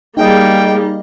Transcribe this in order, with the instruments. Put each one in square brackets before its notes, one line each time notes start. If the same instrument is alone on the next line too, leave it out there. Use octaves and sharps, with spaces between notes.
[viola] G3 A#3 [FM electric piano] D#4 G#4 D#5 [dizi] G5